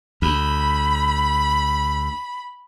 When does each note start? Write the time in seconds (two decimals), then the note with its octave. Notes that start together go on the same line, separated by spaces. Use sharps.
0.22 D2 B5